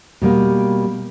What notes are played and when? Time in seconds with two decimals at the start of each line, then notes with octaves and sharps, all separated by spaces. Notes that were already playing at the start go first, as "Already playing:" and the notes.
0.22 B2 G3 A#3